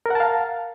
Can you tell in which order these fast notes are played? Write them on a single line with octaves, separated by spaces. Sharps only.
A#4 F#5 A5 F5